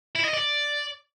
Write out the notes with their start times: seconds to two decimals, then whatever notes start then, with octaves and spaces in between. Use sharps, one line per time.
0.15 E4
0.25 D#5
0.34 D5